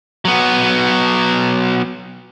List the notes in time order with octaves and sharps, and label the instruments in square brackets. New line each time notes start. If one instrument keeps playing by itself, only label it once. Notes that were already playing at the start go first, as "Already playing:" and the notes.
[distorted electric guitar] F#3 B3